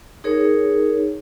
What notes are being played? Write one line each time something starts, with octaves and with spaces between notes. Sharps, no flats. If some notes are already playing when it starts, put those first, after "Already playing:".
D#4 G#4 A#4 C#5